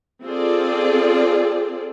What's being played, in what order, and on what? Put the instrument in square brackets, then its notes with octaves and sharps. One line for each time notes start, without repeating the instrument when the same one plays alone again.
[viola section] C4 F4 G#4 A4 D5